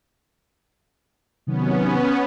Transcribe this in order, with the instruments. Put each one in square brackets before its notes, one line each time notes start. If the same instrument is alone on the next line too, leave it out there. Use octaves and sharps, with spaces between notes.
[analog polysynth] C3 D#3 F#3 [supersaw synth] B3 C#4